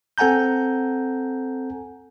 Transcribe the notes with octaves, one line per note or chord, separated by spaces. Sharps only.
C4 A4 F#5 G#5 A#5 G6